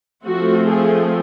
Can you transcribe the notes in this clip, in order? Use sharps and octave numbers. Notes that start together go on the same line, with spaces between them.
F3 A3 C4 F#4
G#4